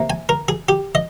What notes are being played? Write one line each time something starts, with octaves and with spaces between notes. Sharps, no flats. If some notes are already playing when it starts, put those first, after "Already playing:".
Already playing: C3 A#3
G#5
A#4
G#4
G4
D#5